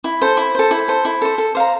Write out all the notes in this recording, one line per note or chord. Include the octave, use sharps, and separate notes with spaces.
E4
A4 C5
E4
A4 C5
E4
A4 C5
E4
A4 C5
A4
C5 F5 A#5